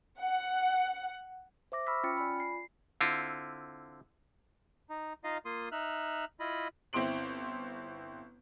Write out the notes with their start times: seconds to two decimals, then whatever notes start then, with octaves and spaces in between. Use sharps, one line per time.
0.20 F#5
1.72 C5 E5 D6 A#6
1.87 B5 C#6 E6 F6 B6
2.03 C#4 F4 G5 F6 A6 C#7
2.17 F4 D5 G#5 B5
2.40 C7
3.01 D3 C4 E4 F4
4.90 D#4
5.24 D#4 F4 D#5 F5
5.45 A#3 F4 C6 D#6
5.72 D#4 E5 F6 F#6
6.40 E4 F4 D#5 B5
6.93 G1 C4 E4 C6 D7 F#7